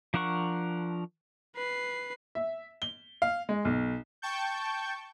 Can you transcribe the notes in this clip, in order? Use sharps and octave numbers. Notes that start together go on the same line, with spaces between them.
F3 D4 A#4 F#5 C#6
B4 C7
E5
G7
F5
G#3
B1
G5 A5 C#6 G6